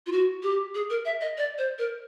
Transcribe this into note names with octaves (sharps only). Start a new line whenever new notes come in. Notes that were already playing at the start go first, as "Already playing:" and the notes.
F4
F#4
G4
G#4
A#4
E5
D#5
D5
C5
A#4